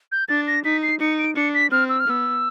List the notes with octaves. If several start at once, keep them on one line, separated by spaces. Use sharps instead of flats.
G6
D4 A6
A#6
D#4 B6
C7
D#4 C#7
D7
D4 C#7
B6
C4 F6
E6
F6
B3 E6